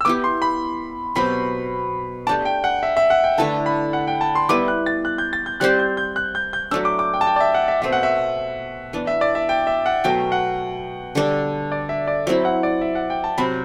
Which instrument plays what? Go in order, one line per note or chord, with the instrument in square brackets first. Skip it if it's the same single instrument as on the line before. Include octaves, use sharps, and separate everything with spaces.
[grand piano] E6
[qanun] B3 E4 G4 [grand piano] D6
[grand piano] C6
B5
[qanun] B2 F#3 C4 G4 [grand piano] B5
[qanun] A3 D4 G4 D5 [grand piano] A5
[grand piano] G5
F#5
E5
E5
F#5
G5
[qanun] D3 A3 E4 B4 [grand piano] A5
[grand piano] B5
F#5
G5
A5
C6
[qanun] G3 B3 E4 B4 [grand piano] D6
[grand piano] F#6
A6
F#6
G6
A6
G6
[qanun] G3 C4 G4 C5 [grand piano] F#6
[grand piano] G6
G6
F#6
G6
G6
[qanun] F#3 A3 D4 [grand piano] E6
[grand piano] D6
D6
G5
A5
G5
D5
E5
F#5
E5
[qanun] B2 A3 C4 [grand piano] E5
[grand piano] F#5
E5
[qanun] E3 B3 D4
[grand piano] E5
D5
E5
G5
E5
F#5
[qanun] B2 F#3 A3 [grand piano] G5
[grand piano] F#5
[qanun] D3 G3 D4
[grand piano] D5
E5
D5
[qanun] F#3 C4 E4 [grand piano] E5
[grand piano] F#5
D5
E5
F#5
G5
A5
[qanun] C3 F#3 C4 F#4 [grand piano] B5